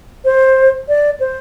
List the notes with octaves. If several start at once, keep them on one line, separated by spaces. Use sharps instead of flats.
C5
D5
C5